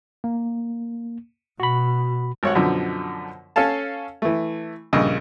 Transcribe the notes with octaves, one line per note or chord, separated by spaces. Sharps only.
A#3
B2 F#4 B5
G#1 C#5 F#5
F#2 B2 D3 F3
C#4 A4 C#5 F5 A5
E3 A3
A#1 G2 C#3 D#5 E6